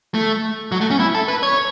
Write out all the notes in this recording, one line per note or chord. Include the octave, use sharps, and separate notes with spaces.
A3
F#3
A3
C#4
E4
A4
B4
C#5